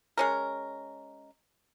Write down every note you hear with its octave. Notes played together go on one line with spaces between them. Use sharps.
G#3 C#4 A#4